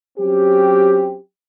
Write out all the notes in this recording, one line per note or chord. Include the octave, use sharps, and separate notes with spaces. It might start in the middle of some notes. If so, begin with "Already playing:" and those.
F#3 C4 C#4 G4